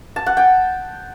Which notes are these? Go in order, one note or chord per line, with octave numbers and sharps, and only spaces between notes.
A5
F#5
G5